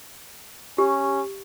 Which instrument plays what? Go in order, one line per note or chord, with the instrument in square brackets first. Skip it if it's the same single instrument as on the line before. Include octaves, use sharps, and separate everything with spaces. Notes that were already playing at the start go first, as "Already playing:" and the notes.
[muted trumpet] C#4 [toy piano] G4